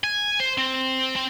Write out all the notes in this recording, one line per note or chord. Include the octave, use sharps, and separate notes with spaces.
G#5
C5
C4
C4